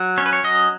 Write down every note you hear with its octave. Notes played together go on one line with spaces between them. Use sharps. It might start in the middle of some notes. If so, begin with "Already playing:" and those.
Already playing: F#3
C#4 C#5
B4
C#5
F#3 D#5